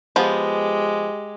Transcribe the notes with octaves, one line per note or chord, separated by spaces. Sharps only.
F3 G#3 B3 G4